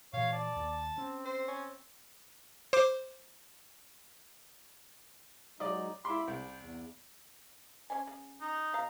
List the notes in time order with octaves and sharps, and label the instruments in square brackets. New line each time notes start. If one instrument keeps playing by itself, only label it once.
[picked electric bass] A#2 E3 [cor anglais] C#5 [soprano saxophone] F5
[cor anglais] D5 [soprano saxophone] A5
[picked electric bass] D#2
[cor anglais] C4 [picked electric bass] C#4
[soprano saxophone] C5
C#4
[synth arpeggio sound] C5 D6
[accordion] F#3 G#3 D#4 [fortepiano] D5 D#5
[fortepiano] E4 C6 [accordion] B5 D6
[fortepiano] C2 [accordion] G6
[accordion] E2
[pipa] C#4 C5 G#5
C#3
[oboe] D#4
[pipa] B2 F5 A#5